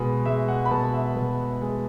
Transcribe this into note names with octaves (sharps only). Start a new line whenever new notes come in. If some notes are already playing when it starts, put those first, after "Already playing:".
Already playing: B2 G#3 B5
G#3 E5
F#5
B5
B2 A5
E5
B2
G#3